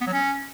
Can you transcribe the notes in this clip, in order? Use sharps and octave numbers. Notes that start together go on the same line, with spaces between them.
B3
F#3
C#4